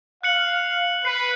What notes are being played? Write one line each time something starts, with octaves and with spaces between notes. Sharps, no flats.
F5 F#6 C#7 F#7
B4 C7